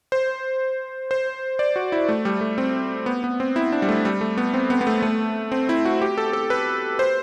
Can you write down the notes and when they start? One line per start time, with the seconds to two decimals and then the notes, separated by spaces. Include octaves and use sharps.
0.12 C5
1.11 C5
1.59 D5
1.76 F#4
1.92 E4
2.09 A3
2.25 G3
2.41 A3
2.58 C4
3.06 B3
3.24 B3
3.40 C4
3.56 E4
3.72 D4
3.82 G3
3.88 A3
4.05 G3
4.21 A3
4.38 B3
4.54 C4
4.70 B3
4.81 B3
4.87 A3
5.02 A3
5.52 C4
5.69 E4
5.85 F#4
6.02 G4
6.18 A4
6.33 A4
6.50 B4
6.99 C5